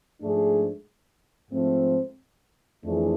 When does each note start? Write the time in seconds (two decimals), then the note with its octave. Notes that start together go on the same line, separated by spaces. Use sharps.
0.20 G#2 F3 A3 D4 G#4
1.51 G#2 F3 A3 C4
2.83 F2 E3 A3 D4 G#4